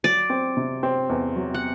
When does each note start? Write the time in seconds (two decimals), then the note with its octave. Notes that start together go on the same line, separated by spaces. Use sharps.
0.04 F#3 D5
0.30 C4
0.57 C3
0.83 C4
1.09 E2
1.36 F#3
1.54 F#5